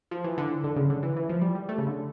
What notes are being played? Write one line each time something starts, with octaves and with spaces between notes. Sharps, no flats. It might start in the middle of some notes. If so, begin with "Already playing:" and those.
F3
E3
D3
D3
C#3
D3
E3
E3
F3
G3
G3
A3
C#3
D3